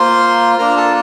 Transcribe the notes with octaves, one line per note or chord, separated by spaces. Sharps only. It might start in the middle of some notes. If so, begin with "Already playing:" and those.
Already playing: A#3 F4 C5 C6
A#3 D4 F4 A#4 A#5
A4 A5